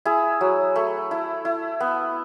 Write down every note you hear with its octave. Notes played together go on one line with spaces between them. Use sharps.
E4 G#4
F#3
A3
E4
E4
B3